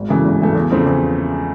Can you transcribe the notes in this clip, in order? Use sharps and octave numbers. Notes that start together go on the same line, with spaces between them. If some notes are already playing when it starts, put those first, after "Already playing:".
Already playing: G#1
F#2 C#3 E3 A3
G#1
F#2 C#3 E3 A3
E2
C#3 F3 A3 C4
E2